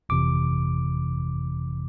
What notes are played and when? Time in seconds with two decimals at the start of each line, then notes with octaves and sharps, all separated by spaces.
0.09 G1 F2 C3 E3 D6